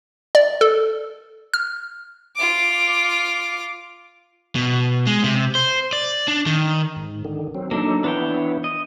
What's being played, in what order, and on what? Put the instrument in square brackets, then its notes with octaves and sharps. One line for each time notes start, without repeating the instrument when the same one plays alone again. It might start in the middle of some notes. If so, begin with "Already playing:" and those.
[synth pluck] D5
A4
F6
[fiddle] F4 D6
[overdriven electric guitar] B2
G#3
C3
C5
D5
D4
D#3
[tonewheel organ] G#2
D3 D#3
F#3 C4
[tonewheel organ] F#3 D#4 A4 [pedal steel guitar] A#3 D4
[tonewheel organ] E3 B3 E4 [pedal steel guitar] D4 C#5 G5
[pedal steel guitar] D#5